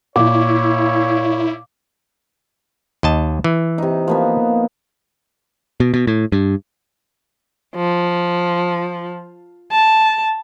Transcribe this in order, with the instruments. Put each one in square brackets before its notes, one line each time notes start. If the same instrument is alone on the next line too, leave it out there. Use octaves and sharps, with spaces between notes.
[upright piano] A#2 [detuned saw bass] E4 [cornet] C#5 [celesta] D6
[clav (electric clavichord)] D#2 D#5 A5
E3
[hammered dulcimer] C3 D#4
F3 A#3 B3
[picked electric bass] B2
B2
A2
G2
[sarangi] F3
A5